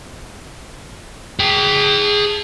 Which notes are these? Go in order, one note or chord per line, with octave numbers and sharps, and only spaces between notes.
G#4 G5